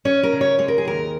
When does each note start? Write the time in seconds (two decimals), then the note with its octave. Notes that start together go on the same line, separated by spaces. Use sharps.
0.05 C#4 C#5
0.23 A#4
0.33 C#3
0.41 C#5
0.58 G#3 C#5
0.68 A#4
0.78 G#4
0.85 D#2 A#4